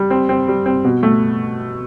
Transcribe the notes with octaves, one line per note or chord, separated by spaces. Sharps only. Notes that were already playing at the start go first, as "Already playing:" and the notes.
Already playing: G3
C4
C4
G3
C4
B2
A3